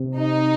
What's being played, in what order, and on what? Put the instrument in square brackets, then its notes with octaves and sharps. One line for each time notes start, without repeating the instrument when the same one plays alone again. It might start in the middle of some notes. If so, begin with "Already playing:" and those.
Already playing: [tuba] C3
[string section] D#4